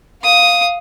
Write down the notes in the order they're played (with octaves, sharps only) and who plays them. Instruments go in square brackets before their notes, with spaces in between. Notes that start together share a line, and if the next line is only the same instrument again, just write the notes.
[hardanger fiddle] F5 D#6